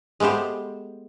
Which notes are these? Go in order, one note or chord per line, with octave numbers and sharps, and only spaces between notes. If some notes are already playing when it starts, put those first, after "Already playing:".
G#3 A3 B3 G4 C5